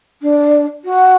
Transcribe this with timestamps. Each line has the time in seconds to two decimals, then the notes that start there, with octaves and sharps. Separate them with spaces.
0.22 D4
0.84 F#4